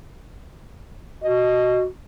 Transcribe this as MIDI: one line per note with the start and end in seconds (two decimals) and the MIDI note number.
1.24 1.86 66
1.24 1.83 75